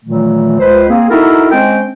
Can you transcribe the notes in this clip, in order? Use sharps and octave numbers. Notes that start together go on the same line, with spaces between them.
A#2 D#3 E3 F#3 A3
C#2 B4 C5
A#3 C4 G#4
D#4 E4 F#4 A4 A#4 E5
G#3 C4 C#4 C5 G5